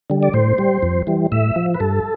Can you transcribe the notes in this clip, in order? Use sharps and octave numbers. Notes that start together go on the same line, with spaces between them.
D3 G3
D5
A2 C5
G3
F2
E3 G3
A2 E5
F3
B4
G2 A4